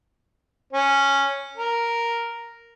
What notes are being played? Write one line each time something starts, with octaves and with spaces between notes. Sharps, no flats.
C#4
A#4